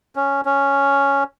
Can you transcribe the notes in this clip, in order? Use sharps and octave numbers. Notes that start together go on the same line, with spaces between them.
C#4
C#4